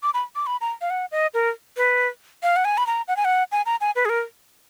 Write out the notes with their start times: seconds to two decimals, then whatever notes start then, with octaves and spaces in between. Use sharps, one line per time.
0.03 D6
0.14 B5
0.36 D6
0.47 B5
0.61 A#5
0.81 F5
0.90 F#5
1.12 D#5
1.34 A#4
1.77 B4
2.43 F5
2.56 F#5
2.65 G#5
2.78 B5
2.87 A#5
3.08 F#5
3.17 G#5
3.25 F#5
3.52 G#5
3.66 A#5
3.81 G#5
3.96 B4
4.05 G#4
4.09 A#4